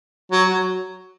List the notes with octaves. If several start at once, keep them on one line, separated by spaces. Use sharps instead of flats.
F#3
F#3